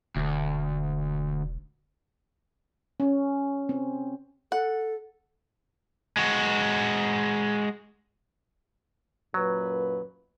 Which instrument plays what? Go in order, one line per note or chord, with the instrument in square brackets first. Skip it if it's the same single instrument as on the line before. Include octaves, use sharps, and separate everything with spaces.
[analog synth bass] E1 [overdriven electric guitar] D2
[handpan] C#4
C4
[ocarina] A4 [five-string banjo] F#5
[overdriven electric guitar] G#3 F#4
[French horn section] F#2 A#2 B4 [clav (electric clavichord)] F#3